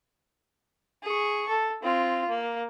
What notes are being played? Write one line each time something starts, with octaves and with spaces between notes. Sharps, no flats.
G#4 C#6
A4
C4 F4
A#3